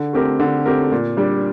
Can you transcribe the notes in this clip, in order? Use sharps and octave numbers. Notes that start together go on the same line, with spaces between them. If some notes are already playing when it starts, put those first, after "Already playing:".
Already playing: D3
A3 C4 G4 A#4
D3
A3 C4 G4 A#4
A#2
G3 D4